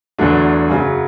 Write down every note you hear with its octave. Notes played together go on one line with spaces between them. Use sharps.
E2 D3 F#3 A3 D4
F#2 C#3 F#3